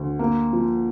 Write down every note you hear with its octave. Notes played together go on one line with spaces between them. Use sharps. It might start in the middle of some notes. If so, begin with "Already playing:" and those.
Already playing: D2
A#3
F3